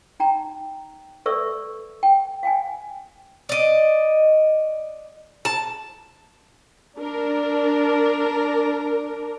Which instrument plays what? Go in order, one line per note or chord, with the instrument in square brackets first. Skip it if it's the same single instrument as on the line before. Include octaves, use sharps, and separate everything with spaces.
[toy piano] D#4 G5 A#5
A4 B4 D5 E5 C#6 E6
G5
F5 G5 G#5
[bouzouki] D5 D#5
A5
[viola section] D4 A#4